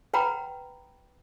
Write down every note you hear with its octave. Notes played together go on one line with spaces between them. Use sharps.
B4 F#5 G5 A#5 B5